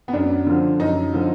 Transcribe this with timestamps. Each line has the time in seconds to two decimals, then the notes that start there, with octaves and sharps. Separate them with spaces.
0.08 B3
0.13 F#2 D4
0.46 D3 F3
0.80 F#2 D#4
1.14 D3 F3